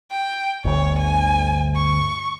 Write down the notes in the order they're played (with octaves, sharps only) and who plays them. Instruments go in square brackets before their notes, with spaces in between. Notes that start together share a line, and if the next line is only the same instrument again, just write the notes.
[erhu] G5
[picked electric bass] G1 D2 [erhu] C#5
[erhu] G#5
C#6